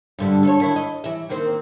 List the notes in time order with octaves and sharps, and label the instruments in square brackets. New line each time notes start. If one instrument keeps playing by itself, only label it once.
[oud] G2 D3 G3
A4 B4 C#5
D#3 E4
D#5
E3 E5
D#3 A#3 C4